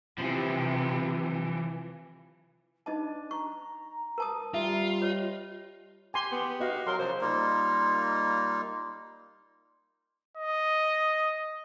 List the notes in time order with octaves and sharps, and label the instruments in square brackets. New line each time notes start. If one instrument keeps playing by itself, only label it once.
[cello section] C3 [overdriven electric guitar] E3 F3
[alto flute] D4 [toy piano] D#4 D#5 A5
[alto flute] A#5 [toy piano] C#6
[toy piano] A#4 A5 D#6
[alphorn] G3 [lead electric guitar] F4 [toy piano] E5
[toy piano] C#5 [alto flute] D#5
[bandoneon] G4 [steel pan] G#5 C6
[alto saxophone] B3
[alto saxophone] F#4 [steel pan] D#5 F5
[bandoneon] F#3 A#4 [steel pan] C6
[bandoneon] C#3 F3 [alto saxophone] C5
[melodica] G3 A#3 D#4 F4
[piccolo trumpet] D#5